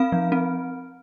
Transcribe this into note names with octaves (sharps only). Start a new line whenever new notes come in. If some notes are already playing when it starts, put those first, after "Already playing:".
Already playing: C4 F5
F3
C4